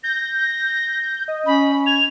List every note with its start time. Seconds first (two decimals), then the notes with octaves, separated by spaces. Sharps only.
0.04 G6 A#6
1.28 D#5
1.46 C#4 B5
1.86 G#6 F7